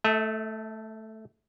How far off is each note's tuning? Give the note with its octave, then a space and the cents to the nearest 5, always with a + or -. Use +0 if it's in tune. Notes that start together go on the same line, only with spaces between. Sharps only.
A3 +0 A4 +0 E5 -40